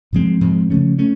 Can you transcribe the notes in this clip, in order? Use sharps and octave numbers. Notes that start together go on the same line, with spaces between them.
G#2 F3 G#3 C4
G#2 F3 G#3 C4
C#3 F3 A3 C#4
A3 C#4